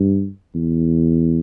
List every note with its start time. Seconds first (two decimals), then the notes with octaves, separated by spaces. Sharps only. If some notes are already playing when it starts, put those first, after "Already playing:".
Already playing: G2
0.55 E2